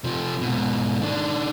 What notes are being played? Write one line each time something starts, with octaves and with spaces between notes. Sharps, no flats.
C3 F3
G#2 B2
D#3 D4